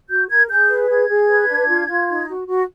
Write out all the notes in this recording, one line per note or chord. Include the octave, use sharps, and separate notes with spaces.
F#4 G6
A#4 G#6
G#4 G6
B4
G#4 G#6
G#4
B4
D4
F4
F4
D#4
F#4
F#4